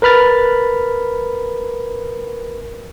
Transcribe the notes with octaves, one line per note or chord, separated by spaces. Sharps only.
A#4 B4 B5 F6 A6